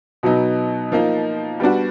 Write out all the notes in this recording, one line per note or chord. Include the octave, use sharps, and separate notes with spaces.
B2 F#3 B3 D#4
F3 A#3 D#4
G3 B3 D4 F#4